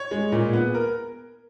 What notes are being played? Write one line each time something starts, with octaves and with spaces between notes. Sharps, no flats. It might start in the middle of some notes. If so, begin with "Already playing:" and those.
Already playing: C#5
G#3
A#2
B3
A#4